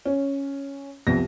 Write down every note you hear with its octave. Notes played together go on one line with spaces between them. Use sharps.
C#4
C2 F2 B3 A#6